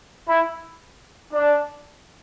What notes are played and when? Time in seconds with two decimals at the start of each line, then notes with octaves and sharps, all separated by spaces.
0.28 E4
1.32 D4